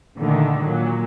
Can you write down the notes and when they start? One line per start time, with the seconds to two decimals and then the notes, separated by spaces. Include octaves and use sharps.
0.18 A#2 D3 D#3 A3
0.60 A#2 F#3